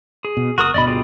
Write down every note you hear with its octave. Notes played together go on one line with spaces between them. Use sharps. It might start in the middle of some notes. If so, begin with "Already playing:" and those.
G#4
B2
F#1 F#4 A#4 D#6
G1 D2 B2 D5 D#5 B5
F4 G4 G#4